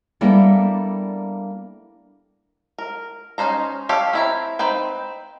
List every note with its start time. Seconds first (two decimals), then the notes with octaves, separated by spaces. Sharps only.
0.21 G3 A#3 B3 D4 E4 A4
2.78 A#4
3.38 C#4 D#4 B4 C5 A#5
3.89 G4 A4 C#5 F5
4.13 C4 E4 A#5
4.59 C4 D#4 B4 G5